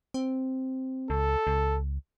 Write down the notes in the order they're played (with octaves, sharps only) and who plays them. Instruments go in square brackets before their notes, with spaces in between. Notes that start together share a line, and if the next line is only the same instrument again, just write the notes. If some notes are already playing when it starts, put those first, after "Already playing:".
[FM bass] C4
[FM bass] C#2 [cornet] A4
[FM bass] C#2